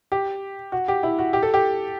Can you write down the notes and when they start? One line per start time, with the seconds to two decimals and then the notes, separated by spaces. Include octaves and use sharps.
0.12 G4
0.72 F#4
0.88 G4
1.03 E4
1.19 F#4
1.33 G4
1.43 A4
1.54 G4